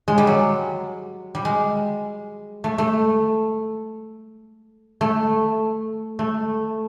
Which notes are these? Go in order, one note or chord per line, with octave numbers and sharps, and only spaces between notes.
G#3
G3
F#3
G3
G#3
A3
A3
A3
A3